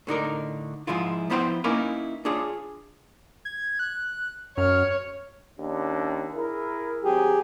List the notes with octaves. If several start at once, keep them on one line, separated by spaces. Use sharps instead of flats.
A2 D3 D#4 A#4
G#2 F3 G#3 E4 F4
F3 B3 E4 C5 E5 G5
A#3 C#4 D#4 E4 A#4 B4
D4 F4 G#4 C#5
G#6
F#6
F#2 C#5 F6
D#2 C#4 D4
E4 G#4 A#4
G#1 F#3 C4 G4 G#4